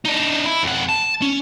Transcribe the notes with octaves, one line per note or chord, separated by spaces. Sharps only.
D4 D#4
E4
F2 F#5
A5
C#4